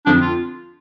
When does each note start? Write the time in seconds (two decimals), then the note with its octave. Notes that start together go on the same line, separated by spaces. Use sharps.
0.06 F2 D3 F3 C4 D4
0.21 F4